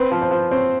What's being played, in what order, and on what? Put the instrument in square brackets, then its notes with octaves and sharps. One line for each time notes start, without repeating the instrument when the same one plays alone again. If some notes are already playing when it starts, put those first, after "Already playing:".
Already playing: [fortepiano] C4 [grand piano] B4
[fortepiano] F3
[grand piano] C5
[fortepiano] F3
[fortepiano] C4 [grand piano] C#5